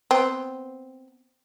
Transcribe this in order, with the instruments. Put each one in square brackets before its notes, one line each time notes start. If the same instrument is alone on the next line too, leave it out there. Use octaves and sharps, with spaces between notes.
[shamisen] B3 C4